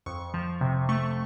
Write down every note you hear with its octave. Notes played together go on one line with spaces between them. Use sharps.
F2 C#6
F3
C3
A3 C#6